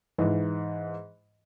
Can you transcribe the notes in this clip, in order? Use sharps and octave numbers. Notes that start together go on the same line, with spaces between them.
G#2 E3